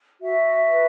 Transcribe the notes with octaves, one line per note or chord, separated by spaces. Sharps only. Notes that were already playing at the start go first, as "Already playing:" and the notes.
F#4 E5
B4